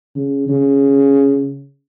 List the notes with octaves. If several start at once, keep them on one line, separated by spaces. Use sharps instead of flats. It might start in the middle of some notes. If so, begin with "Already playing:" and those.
C#3
C#3